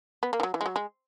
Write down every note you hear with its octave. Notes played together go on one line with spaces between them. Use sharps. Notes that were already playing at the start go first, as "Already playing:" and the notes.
B3
A#3
E3
F#3
E3
G#3
F#3
G#3